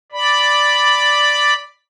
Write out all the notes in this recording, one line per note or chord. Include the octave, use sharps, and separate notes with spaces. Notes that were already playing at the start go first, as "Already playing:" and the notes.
D5 B5